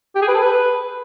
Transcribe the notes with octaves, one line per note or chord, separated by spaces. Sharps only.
G4
G#4
B4
A4
B4